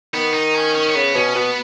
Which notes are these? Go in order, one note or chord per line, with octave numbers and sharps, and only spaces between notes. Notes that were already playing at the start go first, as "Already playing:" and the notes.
D#3 B3
D#4
C#4
C#4
C#4
C#3 B3
B2 C#4
B2 B3